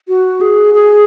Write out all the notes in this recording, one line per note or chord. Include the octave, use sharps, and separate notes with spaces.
F#4
G#4
G#4